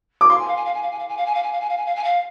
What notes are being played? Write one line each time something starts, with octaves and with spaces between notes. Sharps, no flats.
D6
F5 C6
G#5
F5
G#5
F5
G#5
F5
G#5
F5
G#5
F5
G#5
F5
G#5
F5
G#5
F5
G#5
F5
G#5
F5